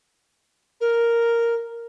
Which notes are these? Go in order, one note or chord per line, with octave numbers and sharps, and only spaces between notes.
A#4